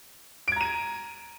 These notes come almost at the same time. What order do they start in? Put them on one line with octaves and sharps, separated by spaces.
D7 G#6 A#5 D#7